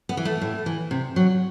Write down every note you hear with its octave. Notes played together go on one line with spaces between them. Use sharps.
B3
E3
A3
A2
E3
C3
F#3